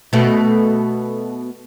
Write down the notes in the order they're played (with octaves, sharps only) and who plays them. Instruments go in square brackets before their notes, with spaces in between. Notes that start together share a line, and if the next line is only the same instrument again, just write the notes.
[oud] B2 A3